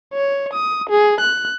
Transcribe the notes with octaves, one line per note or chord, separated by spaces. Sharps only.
C#5
D#6
G#4
F#6